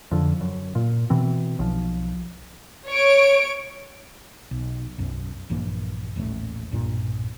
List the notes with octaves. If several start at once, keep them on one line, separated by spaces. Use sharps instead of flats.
F2 D3
F#2
A#2
B2 E3 C4
B1 F3
C#5 D7
B1
B1 F#2
A#1 G2 E3 A#3
D#1 A1 A3
B1 G2 A#2